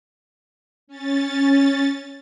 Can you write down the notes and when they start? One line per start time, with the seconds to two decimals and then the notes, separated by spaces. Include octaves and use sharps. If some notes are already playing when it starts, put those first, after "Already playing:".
0.87 C#4 A6